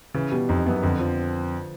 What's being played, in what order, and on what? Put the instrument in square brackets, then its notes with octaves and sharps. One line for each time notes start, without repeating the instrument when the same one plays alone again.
[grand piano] C#3 [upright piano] E3
[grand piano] B2 [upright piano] G3
[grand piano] F2 [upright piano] D#4
[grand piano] F#2 [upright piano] B3
[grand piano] F2 [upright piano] D3
[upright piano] F3